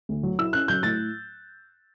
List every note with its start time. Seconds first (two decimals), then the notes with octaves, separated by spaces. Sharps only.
0.09 D2
0.23 F#3
0.39 E4 E6
0.53 C#4 F#6
0.68 F#3 G6
0.83 A2 A6